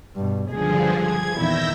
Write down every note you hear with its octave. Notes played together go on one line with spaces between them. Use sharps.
G2 B2
C#2 G2 D3 F3 G#4
G#6
E2 A#2 D#3 E4 E6 G6 A#6